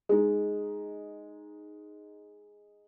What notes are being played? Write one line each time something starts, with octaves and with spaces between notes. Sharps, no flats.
G#3 D#4